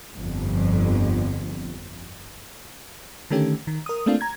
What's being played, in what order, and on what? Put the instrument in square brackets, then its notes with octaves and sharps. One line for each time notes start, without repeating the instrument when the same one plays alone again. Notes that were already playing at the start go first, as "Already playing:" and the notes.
[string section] G1 F2
[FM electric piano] D3 D#3 A3 C#4 G4
D#3
A#4 D#6
A3 A#3 C4 D4 F4
A#5 G#6